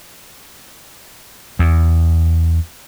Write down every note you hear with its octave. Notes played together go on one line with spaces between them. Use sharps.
E2